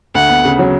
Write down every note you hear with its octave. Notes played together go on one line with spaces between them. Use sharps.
D2 F#5
B3
C#3
F#3